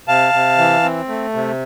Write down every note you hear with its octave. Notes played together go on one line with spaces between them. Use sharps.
C3 F5 A5
C3
E3
C4
A3
C3